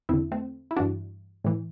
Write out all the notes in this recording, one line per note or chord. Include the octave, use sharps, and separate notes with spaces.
E2 D3 C4 E4
A3 C4
E4
G2 E3 D4 F#4
A2 E3